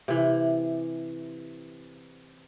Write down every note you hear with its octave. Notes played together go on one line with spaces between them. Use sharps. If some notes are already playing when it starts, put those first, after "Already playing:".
C3 E3